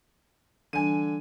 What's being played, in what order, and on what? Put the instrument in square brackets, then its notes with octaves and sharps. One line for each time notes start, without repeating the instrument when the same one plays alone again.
[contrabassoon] D3 [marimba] E3 G3 D4 [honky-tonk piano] G#5 D#7